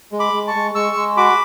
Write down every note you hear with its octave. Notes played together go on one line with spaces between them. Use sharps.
G#3
B5 D6
G#3
A5 C#6
G#3
G#3 C#6 E6
G#3
F#4 B5 D6